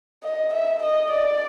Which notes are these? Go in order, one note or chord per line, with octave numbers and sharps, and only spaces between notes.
D#5
E5
D#5
D5